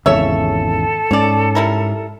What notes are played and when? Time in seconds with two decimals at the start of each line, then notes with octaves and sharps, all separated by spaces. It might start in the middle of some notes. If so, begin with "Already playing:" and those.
0.06 G#1 E2 C#3 A4 C#5 E5
1.11 G#2 C#4 C#5 D5
1.55 G3 E4 A#4